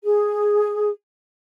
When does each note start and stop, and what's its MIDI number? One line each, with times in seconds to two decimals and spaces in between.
0.05 0.90 68